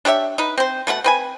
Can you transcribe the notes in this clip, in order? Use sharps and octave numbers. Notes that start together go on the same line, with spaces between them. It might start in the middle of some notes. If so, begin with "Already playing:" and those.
D4 G4 C#5 E5
D#4 B4
C4 C5
B2 A3 E4 F#5
C4 B4 G#5